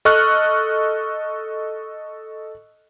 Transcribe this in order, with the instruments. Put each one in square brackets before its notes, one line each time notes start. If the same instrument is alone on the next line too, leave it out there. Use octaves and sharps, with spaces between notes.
[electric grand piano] A4 D#5 C#6 F6 F#6